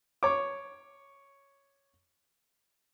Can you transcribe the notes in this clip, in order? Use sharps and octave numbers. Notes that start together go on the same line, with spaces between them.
C#5 D6